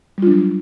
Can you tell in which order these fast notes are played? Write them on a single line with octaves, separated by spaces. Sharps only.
G3 F4 D4 F#3